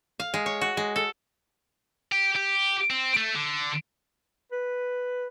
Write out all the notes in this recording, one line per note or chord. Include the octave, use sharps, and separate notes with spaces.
F5
G#3
C#5
F#4
G#3
A4
G4
G4
C4
A3
D3
B4